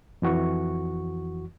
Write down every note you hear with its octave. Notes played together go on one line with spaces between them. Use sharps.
F2 E3 F#4 C#6